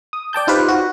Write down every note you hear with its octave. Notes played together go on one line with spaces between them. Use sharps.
D#6
D5 G5 A5 G6
D#4 F4 G4 B4 C5
F#4